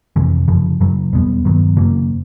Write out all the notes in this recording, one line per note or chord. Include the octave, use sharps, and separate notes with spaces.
F2 C3 E3
F#2 C#3 F3
F#2 C#3 F#3
E2 B2 G3 B3
G2 D#3 F#3 B3
F#2 C#3 F#3 A#3